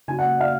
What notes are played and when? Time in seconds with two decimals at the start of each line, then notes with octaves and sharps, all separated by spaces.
0.08 C#3 F#3 G#5
0.19 F#5
0.41 F5